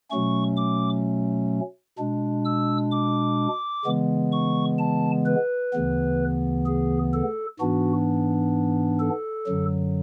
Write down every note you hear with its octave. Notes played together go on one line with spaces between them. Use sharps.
B2 F#3 A3 C#4 C#6
D6
B2 G#3 D4
E6
D6
C#3 E3 G#3 B3
C#6
A5
B4
D2 C#3 E3 B3
G#4
A4
G#2 E3 B3 D4 F#4
A4
F#2 D3 F#3